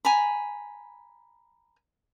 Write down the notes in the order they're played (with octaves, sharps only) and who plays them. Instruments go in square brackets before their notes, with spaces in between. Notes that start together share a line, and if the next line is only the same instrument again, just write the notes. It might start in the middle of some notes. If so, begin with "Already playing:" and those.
[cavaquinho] G#5 A#5 B5